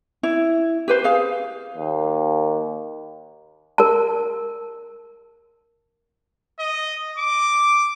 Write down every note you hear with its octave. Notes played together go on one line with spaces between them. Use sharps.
E4
G4 B4 C5
G#4 F5
D#2
A#4 A5
D#5
D6